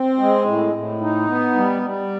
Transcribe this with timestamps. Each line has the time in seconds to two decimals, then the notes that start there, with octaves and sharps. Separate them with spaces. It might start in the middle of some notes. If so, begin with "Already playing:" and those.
Already playing: C4
0.19 G#3
0.46 A2
0.73 A2
1.00 D#4
1.27 B3
1.55 G3
1.82 G3